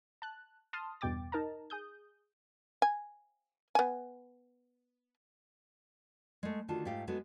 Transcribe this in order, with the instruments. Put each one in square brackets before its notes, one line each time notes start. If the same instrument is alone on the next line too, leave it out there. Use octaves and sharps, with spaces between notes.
[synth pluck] A5 F#6
A5 C6 D#6 F6
E2 G2 B2 G5 D6 A6
D#4 A#4 A5 A#5
G#4 D#6 G6
[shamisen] G#5
B3 G#5
[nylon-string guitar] G#3 A3
D3 D#3 F4 F#4 A5
G#2 A3 F4 G4 F5
G#3 B3 D#4 F#4 A4 D#5